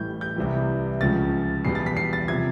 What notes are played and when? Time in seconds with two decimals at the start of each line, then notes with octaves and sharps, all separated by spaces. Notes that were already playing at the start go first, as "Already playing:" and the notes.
Already playing: A1 A2 E3 G3 G6
0.21 G6
0.36 C2 C3 E3 G3
1.01 C#2 C#3 F3 A6
1.65 E2 B2 G3 C7
1.75 A6
1.86 B6
1.97 C7
2.13 A6
2.28 C3 F3 G#6